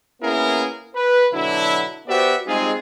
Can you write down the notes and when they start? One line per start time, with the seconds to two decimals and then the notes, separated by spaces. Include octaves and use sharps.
0.22 A#3 B3 C#4 E4 G#4 A#4
0.94 B4
1.32 B2 D3 F#3 D4 E4
2.08 B3 F#4 G4 C5 D5 E5
2.46 G3 G#3 C4 D#4 F4 G#4